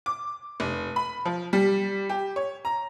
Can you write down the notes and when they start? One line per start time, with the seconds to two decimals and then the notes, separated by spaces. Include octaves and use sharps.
0.06 D6
0.60 F1
0.96 B5
1.25 F3
1.53 G3
2.09 G4
2.36 C#5
2.65 A#5